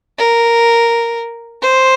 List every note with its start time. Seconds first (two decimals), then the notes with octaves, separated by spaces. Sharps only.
0.19 A#4
1.62 C5